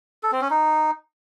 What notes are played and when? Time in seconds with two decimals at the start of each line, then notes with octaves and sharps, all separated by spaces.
0.23 A4
0.32 C4
0.41 C#4
0.51 D#4